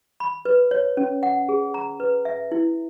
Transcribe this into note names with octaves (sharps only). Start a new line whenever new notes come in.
B5
B4
C#5
C#4
F#5
G#4
A#5
B4
E5
E4